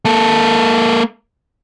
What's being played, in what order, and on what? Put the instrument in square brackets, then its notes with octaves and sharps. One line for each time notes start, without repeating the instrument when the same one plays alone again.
[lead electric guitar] A#3 A4